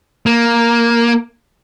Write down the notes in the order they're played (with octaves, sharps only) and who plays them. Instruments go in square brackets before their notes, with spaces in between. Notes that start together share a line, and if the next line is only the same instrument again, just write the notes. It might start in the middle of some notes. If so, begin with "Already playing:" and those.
[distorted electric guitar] A#3